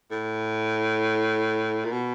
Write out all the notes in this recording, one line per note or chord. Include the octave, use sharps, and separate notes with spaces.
A2
A#2
B2